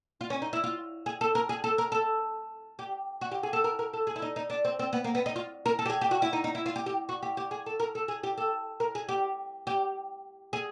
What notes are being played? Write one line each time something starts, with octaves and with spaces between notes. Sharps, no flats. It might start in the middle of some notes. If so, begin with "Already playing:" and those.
F4
C#4
D#4
E4
F4
G#4
A4
A#4
G#4
A4
A#4
A4
G4
F#4
G4
G#4
A4
A#4
A#4
A4
G#4
E4
D#4
D#4
D4
C4
C4
B3
A#3
B3
D#4
F4
A#4
A4
G4
G#4
G4
F#4
E4
D#4
D#4
E4
F4
G4
G4
F#4
G4
G4
G#4
A4
A#4
A4
G#4
G4
A4
A#4
G#4
G4
G4
G#4